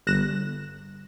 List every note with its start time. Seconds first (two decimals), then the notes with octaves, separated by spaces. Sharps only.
0.07 G1 F#6 A#6 E7